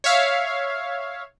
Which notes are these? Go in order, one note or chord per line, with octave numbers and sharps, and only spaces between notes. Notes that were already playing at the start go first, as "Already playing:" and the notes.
C#5 E5 F5